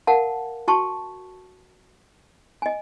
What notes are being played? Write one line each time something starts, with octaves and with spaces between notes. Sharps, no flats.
A#4 F5 F#5 A5
F#4 G5 A5 C#6
D#5 G#5